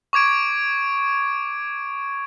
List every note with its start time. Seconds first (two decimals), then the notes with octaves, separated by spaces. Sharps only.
0.13 C#6 D6 G#6 D7